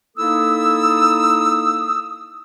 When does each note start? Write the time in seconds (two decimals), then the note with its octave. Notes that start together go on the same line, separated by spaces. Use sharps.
0.17 A#3 D#4 E4 A4 D#6 E6